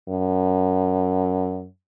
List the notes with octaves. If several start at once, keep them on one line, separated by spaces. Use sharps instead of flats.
F#2